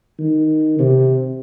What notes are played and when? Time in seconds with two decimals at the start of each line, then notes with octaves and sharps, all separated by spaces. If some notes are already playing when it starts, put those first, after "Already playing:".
0.19 D#3
0.79 C3